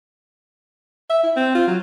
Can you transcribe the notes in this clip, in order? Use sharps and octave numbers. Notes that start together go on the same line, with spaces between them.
E5
E4
C4
F4
F#3